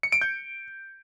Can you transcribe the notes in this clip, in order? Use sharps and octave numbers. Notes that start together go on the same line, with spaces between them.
C#7
D7
G6